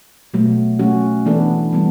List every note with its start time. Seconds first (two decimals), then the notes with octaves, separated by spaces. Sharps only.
0.34 B2 F#3 A3
0.79 F#3 A3 C#4 F#4
1.26 E3 B3 D4 A4
1.73 E3 G3 B3